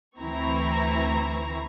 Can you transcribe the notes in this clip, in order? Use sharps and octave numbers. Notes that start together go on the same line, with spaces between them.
D2 E3 C4 E4 A#5 C#6